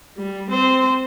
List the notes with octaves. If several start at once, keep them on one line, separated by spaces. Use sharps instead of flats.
G3
C4 C5